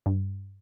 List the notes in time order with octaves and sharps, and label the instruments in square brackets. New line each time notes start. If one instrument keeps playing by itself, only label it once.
[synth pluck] G2